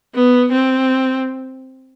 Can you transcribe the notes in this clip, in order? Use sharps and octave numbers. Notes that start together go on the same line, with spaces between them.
B3
C4